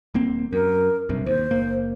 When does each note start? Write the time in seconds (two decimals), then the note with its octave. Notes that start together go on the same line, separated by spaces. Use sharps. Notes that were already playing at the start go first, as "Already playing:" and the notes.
0.14 D#1 A#3 C4
0.53 F#2 A#4
1.09 B1 G2 C3
1.26 D#2 C5
1.51 F#1 A#3